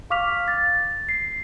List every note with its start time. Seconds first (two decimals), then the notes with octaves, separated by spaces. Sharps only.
0.10 F5 C#6 D6 F6 B6 F7
0.48 A6
1.09 C7